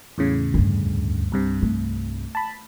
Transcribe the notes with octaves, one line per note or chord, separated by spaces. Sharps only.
E2 A2 C#3
D2 G2
C2 G2 C3
A3
A5 B5